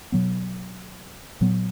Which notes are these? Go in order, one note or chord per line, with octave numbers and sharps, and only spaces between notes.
B2 F#3 B3
A#2 F#3 B3